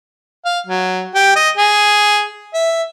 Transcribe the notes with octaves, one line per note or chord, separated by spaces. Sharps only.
F5
F#3
G4
D#5
G#4
E5